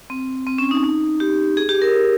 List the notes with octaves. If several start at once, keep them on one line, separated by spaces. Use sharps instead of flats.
C4
C4
C#4
D#4
D#4
G4
G#4
G4
A#4